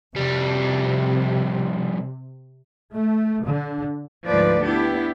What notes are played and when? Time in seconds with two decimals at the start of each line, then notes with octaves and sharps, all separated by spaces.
0.16 F2 C3 G3
2.94 A3
3.44 D3
4.27 D2 G#2 F3 B4 D5
4.63 B3 D4 E4 G4